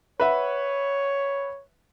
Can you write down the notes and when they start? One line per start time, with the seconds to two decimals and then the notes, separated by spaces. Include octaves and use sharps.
0.20 B4 C#5 E5 F#5